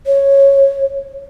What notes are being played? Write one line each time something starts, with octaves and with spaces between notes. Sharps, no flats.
C#5